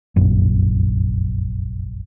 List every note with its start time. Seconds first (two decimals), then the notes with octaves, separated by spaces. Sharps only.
0.16 F1 A#1 F#2